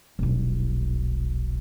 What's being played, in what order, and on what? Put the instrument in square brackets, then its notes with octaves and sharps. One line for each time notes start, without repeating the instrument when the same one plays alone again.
[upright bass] D#1 B1